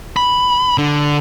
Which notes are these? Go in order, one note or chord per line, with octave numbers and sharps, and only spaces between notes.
B5
D3